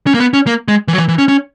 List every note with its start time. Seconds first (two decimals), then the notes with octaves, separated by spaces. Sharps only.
0.07 C#4
0.14 A#3
0.20 B3
0.33 C#4
0.47 A#3
0.68 G#3
0.88 E3
0.93 F#3
0.98 E3
1.08 E3
1.18 C#4
1.29 C#4